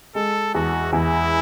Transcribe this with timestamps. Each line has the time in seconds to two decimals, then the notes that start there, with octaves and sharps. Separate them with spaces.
0.15 G#3 A4
0.55 E2 F#4
0.93 E2 E4